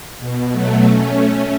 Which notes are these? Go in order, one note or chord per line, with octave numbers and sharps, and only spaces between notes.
B2
F#3 A3
A3 C#4